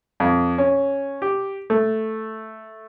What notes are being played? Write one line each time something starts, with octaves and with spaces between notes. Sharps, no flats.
F2
C#4
G4
A3